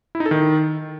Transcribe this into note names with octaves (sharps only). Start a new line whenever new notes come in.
E4
D#4
A4
D#3